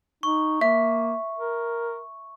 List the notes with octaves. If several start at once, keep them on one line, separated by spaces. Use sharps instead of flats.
D#4 C#6
A#3 E5
A#4